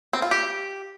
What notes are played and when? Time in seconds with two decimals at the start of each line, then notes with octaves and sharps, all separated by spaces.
0.13 C4
0.22 F4
0.31 G4